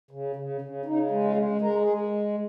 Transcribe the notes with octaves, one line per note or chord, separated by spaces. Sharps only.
C#3
C#3
C#3
C#3 D#4
G#3
F4
G#3
G#3 A#4
G#4
G#3